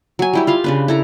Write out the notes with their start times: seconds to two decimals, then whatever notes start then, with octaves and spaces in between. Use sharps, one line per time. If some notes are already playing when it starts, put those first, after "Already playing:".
0.19 F#3 G#5
0.33 G3 E4 G4
0.47 F4 F5 C6
0.64 C#3 D4 B4
0.88 E4 A4 A#5